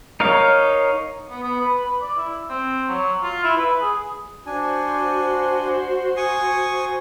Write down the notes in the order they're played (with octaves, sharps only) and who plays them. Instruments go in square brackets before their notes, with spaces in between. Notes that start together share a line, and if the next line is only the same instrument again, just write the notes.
[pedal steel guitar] D#4 A#4 C#5 F5
[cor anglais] B3
B3
B4
B4
D5
E4
C4
F#3
F4
E4
B4
G#4
[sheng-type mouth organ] D4 G#5 [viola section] F#4 C5
[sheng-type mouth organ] G#5 C#6 D#6